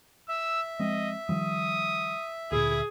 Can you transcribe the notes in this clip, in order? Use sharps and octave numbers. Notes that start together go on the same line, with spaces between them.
E5 E6
F3 G#3 C4 D#5
D#3 F3 G3 D#6
D2 A#2 E4 G#4